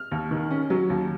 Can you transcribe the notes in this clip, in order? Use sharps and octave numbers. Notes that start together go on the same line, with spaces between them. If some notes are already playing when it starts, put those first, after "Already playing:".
Already playing: F6
D#2
D#3
C#4
F#3
D#2